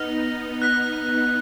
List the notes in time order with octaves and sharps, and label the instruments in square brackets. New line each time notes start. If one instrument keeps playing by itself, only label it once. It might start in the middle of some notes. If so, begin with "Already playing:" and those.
Already playing: [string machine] B3 D#4 [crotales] F6 A#6 F7
[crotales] F#6 B6